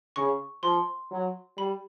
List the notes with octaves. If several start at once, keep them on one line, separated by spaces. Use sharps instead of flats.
C#3 C#6
F3 C6
F#3
G3 B5